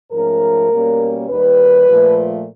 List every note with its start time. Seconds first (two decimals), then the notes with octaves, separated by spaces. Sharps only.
0.12 G#2 F3 A3 C#4 A#4
0.71 B2 G3 A#3 C#4
1.29 D#2 D#3 G3 B4
1.89 A#2 F3 A3